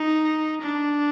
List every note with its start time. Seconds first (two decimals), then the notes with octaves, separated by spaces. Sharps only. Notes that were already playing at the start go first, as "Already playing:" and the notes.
Already playing: D#4
0.62 D4